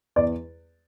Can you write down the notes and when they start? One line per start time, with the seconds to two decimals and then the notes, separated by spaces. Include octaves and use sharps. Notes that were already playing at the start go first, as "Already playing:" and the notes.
0.16 E2 D5